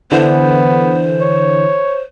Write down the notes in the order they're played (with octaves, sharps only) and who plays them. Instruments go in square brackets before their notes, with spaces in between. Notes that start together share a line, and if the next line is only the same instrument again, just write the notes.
[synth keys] D3 E3 [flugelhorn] B3 [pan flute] C5
[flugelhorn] C#5